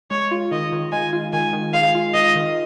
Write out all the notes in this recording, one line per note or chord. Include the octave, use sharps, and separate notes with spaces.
G#3 C#5
F4
D#3 D#5
D#3
G#3 G#5
F4
D#3 G#5
D#3
G#3 F5
F4
D#3 D#5
D#3